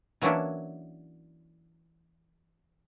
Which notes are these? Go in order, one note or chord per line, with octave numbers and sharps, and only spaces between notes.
E3 F#3 A#3 C#4 D4 E4